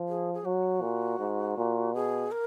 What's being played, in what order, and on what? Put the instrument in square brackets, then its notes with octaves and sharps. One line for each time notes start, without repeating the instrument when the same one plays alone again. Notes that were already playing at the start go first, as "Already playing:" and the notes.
Already playing: [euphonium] F3
[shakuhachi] G#4
G#4
[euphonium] F#3 [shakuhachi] F#4
[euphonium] A#2
G#2
A#2
[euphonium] B2 [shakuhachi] G#4
[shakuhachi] A#4